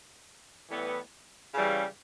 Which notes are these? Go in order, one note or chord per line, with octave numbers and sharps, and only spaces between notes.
A2 E3 G3 B3
C#3 E3 G3